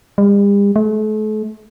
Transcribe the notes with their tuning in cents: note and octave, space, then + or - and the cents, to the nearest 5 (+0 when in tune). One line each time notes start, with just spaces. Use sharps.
G3 +45
A3 -40